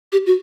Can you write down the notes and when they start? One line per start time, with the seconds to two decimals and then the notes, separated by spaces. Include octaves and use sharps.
0.12 G4
0.26 F#4